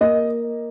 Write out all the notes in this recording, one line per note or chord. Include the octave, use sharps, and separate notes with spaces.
A#3 D#5